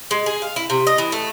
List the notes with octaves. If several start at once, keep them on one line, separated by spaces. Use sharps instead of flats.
G#3
G#4
F5
E4
C3
D#5
E3
A3